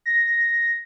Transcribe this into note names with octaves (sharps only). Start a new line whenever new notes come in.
A#6